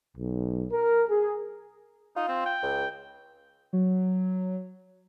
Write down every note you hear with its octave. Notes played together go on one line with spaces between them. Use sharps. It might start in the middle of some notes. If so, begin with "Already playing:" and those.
B1
A#4
G#4
D#4 F4
C4
G5
C#2
F#3